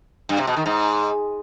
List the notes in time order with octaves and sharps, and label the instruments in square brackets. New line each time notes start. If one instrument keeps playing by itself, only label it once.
[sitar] G2
C3
B2
D#3
G#2